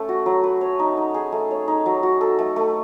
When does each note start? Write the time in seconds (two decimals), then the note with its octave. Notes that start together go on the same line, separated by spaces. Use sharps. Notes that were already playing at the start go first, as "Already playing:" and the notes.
Already playing: A3 C#4 A4
0.09 F#4
0.26 F#3
0.44 B4
0.61 C#5
0.79 D#4
0.97 D#4
1.14 G#4
1.32 A3
1.51 C#5
1.68 D#4
1.86 F#3
2.03 F#4
2.21 A4
2.39 A3
2.56 A3